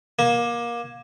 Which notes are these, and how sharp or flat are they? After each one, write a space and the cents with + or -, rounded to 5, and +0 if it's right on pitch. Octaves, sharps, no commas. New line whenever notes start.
A#3 +25